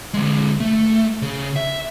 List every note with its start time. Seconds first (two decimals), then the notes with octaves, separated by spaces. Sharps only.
0.14 D3 G#3
0.60 A3
1.22 C#3
1.56 E5